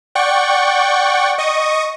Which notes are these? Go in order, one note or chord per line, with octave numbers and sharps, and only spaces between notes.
D5 F#5 G5 C#6
D#5 C#6 D#6